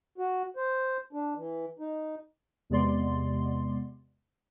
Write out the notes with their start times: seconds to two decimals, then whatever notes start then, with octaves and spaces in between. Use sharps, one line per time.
0.18 F#4
0.56 C5
1.13 D4
1.36 E3
1.79 D#4
2.70 E2 C3 G#3 B3 D5 C6